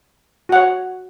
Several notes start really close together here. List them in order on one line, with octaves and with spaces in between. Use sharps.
F#4 F#5 C#5